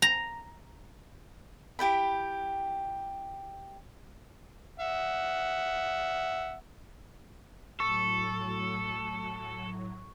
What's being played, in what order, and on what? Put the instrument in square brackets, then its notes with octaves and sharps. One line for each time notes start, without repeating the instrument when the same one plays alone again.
[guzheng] A#5
[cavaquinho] E4 G4 G5 B5
[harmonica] E5 F#5
[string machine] A2 F#3 [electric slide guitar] A4 [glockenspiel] C#6